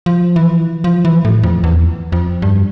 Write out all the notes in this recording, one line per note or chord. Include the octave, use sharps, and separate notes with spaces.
F3
E3
F3
E3
A2
F2
E2
F2
G2